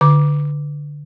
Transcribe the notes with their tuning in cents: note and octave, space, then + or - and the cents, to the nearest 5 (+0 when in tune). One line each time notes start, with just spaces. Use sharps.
D3 +0 D6 +0